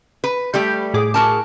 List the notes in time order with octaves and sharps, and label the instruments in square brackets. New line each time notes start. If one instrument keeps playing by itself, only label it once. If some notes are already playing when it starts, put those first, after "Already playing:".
[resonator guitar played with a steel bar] B4
G3 A3 G4
[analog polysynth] A2 G#4 D6
[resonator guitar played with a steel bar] F#4 A#4 A5